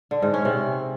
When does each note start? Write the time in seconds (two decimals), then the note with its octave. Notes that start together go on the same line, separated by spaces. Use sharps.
0.11 D3
0.22 G#2
0.34 C#4
0.45 C3